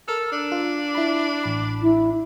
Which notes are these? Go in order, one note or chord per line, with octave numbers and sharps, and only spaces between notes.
A4 A#4 E6 F6
D4
F4
E4 B5
A1 B5
E4